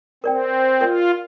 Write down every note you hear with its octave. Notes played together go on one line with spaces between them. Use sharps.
C4 A#4 D5 G5
F4 A#4 D5 G5